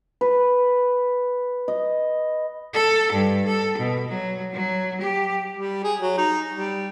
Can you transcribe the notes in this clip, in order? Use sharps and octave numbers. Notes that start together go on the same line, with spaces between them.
B4
D#5
A4
G2
A4
B2
F#3
F#3
G4
G3
G#4
F#3
D#4
G3